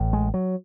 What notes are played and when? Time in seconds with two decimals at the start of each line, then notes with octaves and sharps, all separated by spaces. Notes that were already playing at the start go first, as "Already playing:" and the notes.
Already playing: A1 A2
0.13 G#3
0.34 F#3